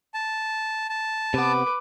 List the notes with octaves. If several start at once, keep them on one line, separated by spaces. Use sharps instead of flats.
A5
A5
C3 B3 B4 D6